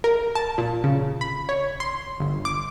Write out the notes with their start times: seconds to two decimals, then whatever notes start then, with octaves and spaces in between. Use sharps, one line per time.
0.04 A#4
0.35 A5
0.58 A#2
0.84 C#3
1.21 B5
1.49 C#5
1.80 C6
2.20 G1
2.45 D6